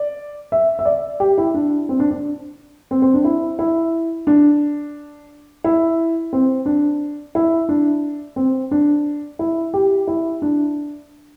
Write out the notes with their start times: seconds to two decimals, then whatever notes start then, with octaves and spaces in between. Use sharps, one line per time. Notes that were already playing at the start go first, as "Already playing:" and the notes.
Already playing: D5
0.52 E5
0.79 E5
0.85 D5
1.20 G4
1.38 E4
1.54 D4
1.89 C4
2.00 D4
2.11 D4
2.91 C4
3.02 C4
3.14 D4
3.25 E4
3.59 E4
4.27 D4
5.64 E4
6.33 C4
6.66 D4
7.35 E4
7.69 D4
8.36 C4
8.71 D4
9.39 E4
9.74 G4
10.07 E4
10.42 D4